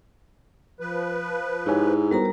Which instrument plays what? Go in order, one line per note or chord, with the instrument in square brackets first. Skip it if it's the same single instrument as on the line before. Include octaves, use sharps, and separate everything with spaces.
[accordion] F3 B4
[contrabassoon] G#2 [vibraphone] E4 [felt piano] G4 C#5 G#5
[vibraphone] G3 A#4 A#5 [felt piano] B3 F#4 C5